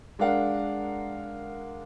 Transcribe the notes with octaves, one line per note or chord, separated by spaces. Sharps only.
G#3 D4 A#4 F5 F#5